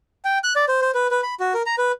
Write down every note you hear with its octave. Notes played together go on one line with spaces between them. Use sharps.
G5
F#6
D5
C5
C5
B4
B4
B5
F#4
A#4
A#5
B4